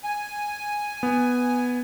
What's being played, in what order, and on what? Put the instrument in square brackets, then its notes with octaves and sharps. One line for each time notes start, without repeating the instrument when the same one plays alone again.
[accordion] G#5
[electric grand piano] B3